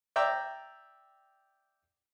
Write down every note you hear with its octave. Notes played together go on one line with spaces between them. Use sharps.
D5 E5 G5 A#5